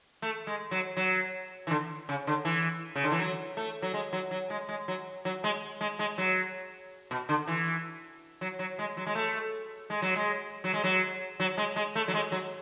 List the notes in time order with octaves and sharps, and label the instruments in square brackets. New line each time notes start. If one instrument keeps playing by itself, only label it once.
[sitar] A3
G#3
F#3
F#3
E3
D3
C#3
D3
E3
C#3
D3
E3
F#3
A3
F#3
G#3
F#3
F#3
G#3
G#3
F#3
F#3
G#3
G#3
G#3
F#3
B2
D3
E3
F#3
F#3
G#3
F#3
G#3
A3
G#3
F#3
G#3
F#3
G#3
F#3
F#3
G#3
G#3
A3
F#3
G#3
F#3